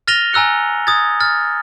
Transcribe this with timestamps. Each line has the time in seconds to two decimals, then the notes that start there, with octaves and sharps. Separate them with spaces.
0.08 F6 A6 A#6 D#7 F7 G7
0.33 G#5 A#5 E6 F#6 C#7
0.87 D#6 G#6 A6
1.20 F6 A6